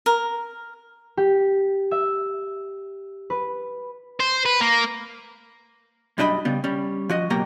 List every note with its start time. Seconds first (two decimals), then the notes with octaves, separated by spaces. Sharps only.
0.06 A#4
1.17 G4
1.91 E5
3.30 B4
4.20 C5
4.46 B4
4.61 A#3
6.18 F#2 G3 D4 D#5 B5
6.45 C#3 G3 B3
6.64 G3 C#4
7.09 F3 F#4 D#5
7.30 C#2 B2 F#3 A#3 G4 A#5